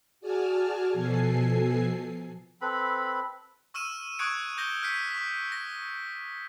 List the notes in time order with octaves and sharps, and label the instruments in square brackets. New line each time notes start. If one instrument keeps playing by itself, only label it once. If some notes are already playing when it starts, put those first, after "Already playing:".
[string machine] F#4 G#4 D5 G#5 A5 F6
B2 F3 A4 G#5 C7
[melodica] C4 A4 B4 B5
[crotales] C#6 E6 F6 D#7 E7
C#6 D#6 F#6 G#6 C#7 D7
D6 G6 A#6 G7
F6 G6 B6 C#7
C#6 B6
A#6